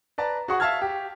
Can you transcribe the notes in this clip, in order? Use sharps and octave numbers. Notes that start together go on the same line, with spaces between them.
B4 D5 A5 A#5
F#4 G#4 F#5 C#6
E5 F5 A5 E6 F6 G#6
G4